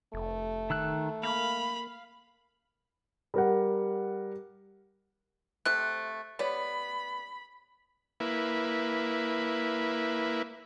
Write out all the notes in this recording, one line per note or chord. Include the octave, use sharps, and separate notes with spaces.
F1 A3
D#3 E6 F#6
A#3 F5 B5
G3 A#4 F#5
C3 A3 C5 F#6
B3 G4 C#5 D5 B5
A#3 E4 B4